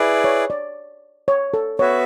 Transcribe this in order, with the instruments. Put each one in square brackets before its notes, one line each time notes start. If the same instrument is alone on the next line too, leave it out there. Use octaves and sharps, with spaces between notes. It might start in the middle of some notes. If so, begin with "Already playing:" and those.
Already playing: [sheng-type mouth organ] E4 G#4 B4 D5
[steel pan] C#5
D5
C#5
A4
[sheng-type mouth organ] B3 F#4 B4 E5 [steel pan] C#5